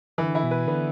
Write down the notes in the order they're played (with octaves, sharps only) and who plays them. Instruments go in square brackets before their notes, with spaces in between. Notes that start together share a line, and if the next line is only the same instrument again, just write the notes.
[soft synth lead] D3 [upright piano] E3
[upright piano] E4
[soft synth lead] B2
[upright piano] B4
[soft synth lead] D3 [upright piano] B3